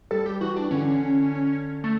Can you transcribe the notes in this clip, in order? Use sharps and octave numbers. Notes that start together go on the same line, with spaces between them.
G3 A4
G4
E3 F#4
D4
D3 C#4
A3